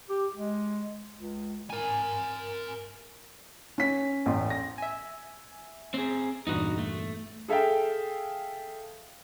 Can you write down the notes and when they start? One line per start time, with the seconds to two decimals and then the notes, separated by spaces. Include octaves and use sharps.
0.09 G4
0.36 G#3
1.14 C#2
1.70 A#4 G#5
3.78 C#4 B6
4.26 A1 E2 C6
4.50 A#6
4.78 E5 G#5
5.94 C4 G#4
6.47 E2 G2 A#2 D#4 F#4
6.78 A3
7.48 G#4 A4 E5 F5 G5